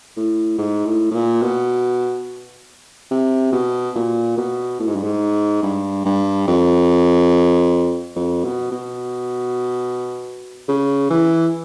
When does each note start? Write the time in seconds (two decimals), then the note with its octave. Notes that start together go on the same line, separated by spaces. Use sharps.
0.17 A2
0.58 G#2
0.86 A2
1.11 A2
1.15 A#2
1.43 B2
3.11 C3
3.53 B2
3.96 A#2
4.37 B2
4.79 A2
4.87 G#2
4.95 G2
5.04 G#2
5.63 G2
6.06 G2
6.48 F2
8.16 F2
8.44 B2
8.72 B2
10.68 C#3
11.10 E3